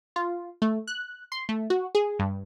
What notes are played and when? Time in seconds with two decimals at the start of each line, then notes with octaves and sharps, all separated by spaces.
0.16 F4
0.62 A3
0.87 F#6
1.32 C6
1.49 A3
1.70 F#4
1.95 G#4
2.19 G2